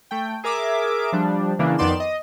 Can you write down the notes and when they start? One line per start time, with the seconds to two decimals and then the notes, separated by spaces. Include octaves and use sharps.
0.11 A3 G5
0.44 G#4 A#4 E5 D6
1.12 F3 G3 D4
1.59 C#3 E3 A#3 D4
1.78 F2 D#3 B3 D5 C6 E7
2.00 D#5